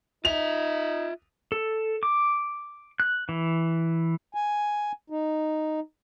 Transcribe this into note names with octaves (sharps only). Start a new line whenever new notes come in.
D#4 F4 E5 F7
A4
D6
F#6
E3
G#5
D#4